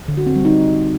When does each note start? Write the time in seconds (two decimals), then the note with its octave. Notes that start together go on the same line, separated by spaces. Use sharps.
0.08 D3
0.17 F#4
0.27 C4
0.36 G3
0.45 D#4